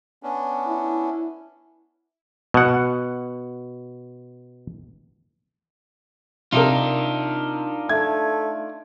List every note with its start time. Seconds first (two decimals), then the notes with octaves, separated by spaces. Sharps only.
0.23 B3 C#4 D4
0.67 E4
2.54 B2 F#5
6.52 C3 D4 D#4 F4 A#4
7.89 A3 G#6